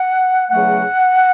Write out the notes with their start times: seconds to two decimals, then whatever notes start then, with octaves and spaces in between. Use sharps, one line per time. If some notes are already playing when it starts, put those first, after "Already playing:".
Already playing: F#5
0.51 E2 C#3 F#3 A3 F#5